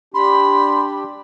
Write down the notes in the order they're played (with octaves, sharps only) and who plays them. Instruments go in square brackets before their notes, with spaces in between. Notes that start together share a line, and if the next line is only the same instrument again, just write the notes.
[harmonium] D4 G4 [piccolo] B5 [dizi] C6